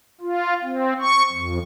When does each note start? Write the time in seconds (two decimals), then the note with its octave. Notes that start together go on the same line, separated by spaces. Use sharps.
0.21 F4
0.63 C4
1.00 C#6
1.32 F2